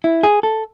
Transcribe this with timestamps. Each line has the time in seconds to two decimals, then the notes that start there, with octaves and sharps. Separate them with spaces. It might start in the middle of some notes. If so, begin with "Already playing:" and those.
0.04 E4
0.23 G#4
0.43 A4